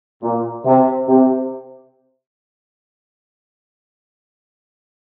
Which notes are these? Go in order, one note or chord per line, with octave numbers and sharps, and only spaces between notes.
A#2
C3
C3